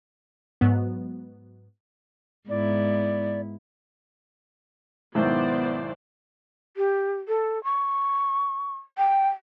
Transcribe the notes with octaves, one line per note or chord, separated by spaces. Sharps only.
G#2 F#3 B3
G#2 B3 E4 D5
B1 G#2 D#3 B3 E4 C5 D5
G4
A4
C#6
G5